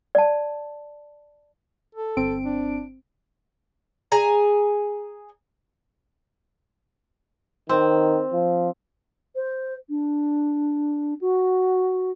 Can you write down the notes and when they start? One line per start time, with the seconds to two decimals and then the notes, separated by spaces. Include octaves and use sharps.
0.15 D5 A5
1.95 A4
2.17 G1 C4 D7
2.45 D4
4.12 G#4 G#5 A#5
7.69 D#3 C4
8.33 F3
9.36 C5
9.89 D4
11.21 F#4